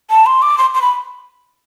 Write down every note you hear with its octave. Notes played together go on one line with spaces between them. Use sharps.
A5
C6
D6
C6
C6
B5